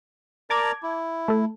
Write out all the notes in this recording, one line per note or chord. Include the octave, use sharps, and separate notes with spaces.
A#4 D5 A5 A#5 D6 G#6
E4
A3 A4